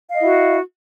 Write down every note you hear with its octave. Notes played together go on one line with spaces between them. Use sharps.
E4 F#4 D#5 F5